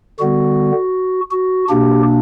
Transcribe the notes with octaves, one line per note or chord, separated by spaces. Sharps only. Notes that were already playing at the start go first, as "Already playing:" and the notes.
D3 G3 B3 F#4
F#4
B2 A#3 D4 G4